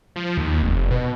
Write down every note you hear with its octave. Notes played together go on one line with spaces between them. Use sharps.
F3
D#2
F1
B2